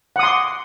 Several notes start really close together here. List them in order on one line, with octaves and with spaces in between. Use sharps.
F#5 D#6 C6 D6